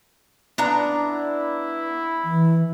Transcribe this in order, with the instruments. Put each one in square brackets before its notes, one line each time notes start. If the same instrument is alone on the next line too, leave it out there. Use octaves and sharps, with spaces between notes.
[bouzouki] B3 D4 A#5
[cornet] E4
[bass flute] E3